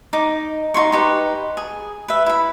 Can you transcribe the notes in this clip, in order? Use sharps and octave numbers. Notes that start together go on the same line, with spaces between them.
D#4 D6
D#4 F4 C6 C#6
D#4 G4 B4
G#4
B4 E5
E4 B5